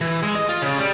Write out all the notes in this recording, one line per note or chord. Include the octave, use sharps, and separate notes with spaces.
E3
G#3
D#5
F4
C#3
G3